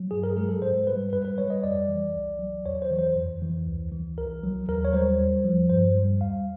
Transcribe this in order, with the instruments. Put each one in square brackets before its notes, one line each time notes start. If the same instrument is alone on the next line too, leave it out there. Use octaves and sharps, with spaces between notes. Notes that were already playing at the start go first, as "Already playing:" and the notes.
Already playing: [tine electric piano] F#3
G2 G#4
A#4
G#3 G#4
A4
G#2 C5
G3 B4
F#2 B4
B4
G3 C#5
D#5
F2 D5
E3
C2
F#3
E2 C#5
C5
E3
C5
F2
E3
D2
E3
C2 A#4
F#3
D#2 A#4
C#5
G3 C5
E2
F3
G2 C5
G3
E2 F5